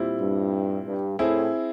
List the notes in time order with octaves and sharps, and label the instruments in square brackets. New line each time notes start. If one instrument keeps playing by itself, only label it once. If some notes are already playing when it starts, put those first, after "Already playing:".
Already playing: [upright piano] A#2 G3 C4 E4
[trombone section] G2
G2
[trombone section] A2 [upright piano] C4 E4 G#4